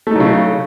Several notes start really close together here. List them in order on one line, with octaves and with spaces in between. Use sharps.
A3 D#4 F#3 C#3